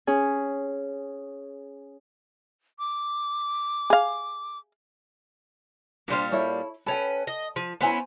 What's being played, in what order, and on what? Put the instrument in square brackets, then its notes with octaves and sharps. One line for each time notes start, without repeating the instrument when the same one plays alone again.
[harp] C#4 G#4 G#5
[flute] D6
[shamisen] G#4 F5
[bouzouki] A#2 G3 F5 [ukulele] D4 C5
[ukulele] E4 A4 C#5
[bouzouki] C#4 B4 [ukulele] A4 G5
[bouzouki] D#5
F3
[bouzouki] B3 C#4 E4 [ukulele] C5 G#5 A#5